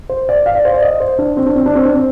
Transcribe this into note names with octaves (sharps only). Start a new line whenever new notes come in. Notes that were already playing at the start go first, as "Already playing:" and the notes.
C5
D5
F5
D5
C5
D5
D#5
C5
D4
C4
D4
C4
D4
C4
D4
C4